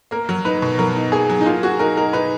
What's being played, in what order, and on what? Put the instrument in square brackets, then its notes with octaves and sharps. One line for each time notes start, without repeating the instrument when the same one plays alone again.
[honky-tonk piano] A#3 [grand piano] A#4
[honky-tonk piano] F#3
[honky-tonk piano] D#4 [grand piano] B4
[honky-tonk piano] B2
[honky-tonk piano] F#3 [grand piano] A#4
[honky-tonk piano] D#4
[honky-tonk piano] A#3 [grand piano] G#4
[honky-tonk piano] F#3
[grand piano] D#4
[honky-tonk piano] A#3 [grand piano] F4
[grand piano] F#4 [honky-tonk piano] G#4
[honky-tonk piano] D#4 [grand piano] A#4
[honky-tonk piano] D#4 [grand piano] A#4
[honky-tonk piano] D#4 [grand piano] B4